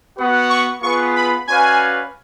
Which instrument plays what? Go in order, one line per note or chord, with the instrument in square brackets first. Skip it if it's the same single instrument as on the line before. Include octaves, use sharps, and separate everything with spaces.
[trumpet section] B3 F#4 B4 F#5
[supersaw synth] C#6
[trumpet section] B3 F4 G#4 B4 [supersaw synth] C#6
[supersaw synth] B5
[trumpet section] C#4 F#4 B4 D5 F5 [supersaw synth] G#5